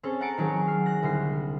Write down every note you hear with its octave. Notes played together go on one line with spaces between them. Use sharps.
C4 C#4 G#4 A4
F#5 A5 A#5 C#7 D7
D#3 F#3 G#4 C#5
F6 C7
F#6 A#6
C2 D3 G3 C7